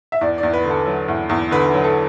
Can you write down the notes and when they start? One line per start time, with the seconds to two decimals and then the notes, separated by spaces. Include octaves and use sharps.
0.12 E5
0.21 E2 D5
0.38 D5
0.43 E2
0.53 B4
0.64 D3
0.70 A4
0.86 F#3
1.08 E2
1.30 E2
1.51 D3 B4
1.74 F#3
1.84 A4